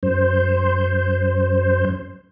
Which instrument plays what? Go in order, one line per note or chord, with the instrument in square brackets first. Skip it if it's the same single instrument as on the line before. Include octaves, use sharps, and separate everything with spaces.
[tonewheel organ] F#2 C5